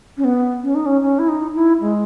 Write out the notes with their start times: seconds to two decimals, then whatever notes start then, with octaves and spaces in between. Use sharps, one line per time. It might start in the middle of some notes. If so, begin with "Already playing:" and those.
0.17 C#4
0.24 B3
0.63 C#4
0.75 D#4
0.86 C#4
1.02 C#4
1.19 E4
1.28 D#4
1.55 E4
1.81 G#3